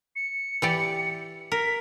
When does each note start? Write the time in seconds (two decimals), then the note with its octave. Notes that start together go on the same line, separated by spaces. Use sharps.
0.16 C#7
0.62 E3 G4 D5
1.52 A#4 B6